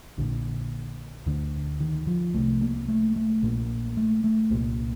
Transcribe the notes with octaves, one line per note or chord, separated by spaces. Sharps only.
A#1 A#2 D3
D2 D3
D#3
F3
C2 C3 A3
A#3
A3
A3
A#1 A#2 A#3
A3
A3
C2 A#2 A#3